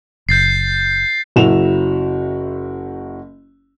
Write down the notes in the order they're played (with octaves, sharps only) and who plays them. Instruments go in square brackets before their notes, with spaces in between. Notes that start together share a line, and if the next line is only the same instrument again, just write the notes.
[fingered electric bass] F#1 [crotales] G6 A6 C7
[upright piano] F#1 F#3 E4 F#4 E7 F7